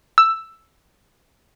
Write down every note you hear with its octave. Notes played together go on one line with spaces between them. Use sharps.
E6